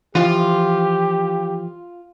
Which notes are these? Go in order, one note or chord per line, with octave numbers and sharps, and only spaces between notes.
E3 F3 F4 G4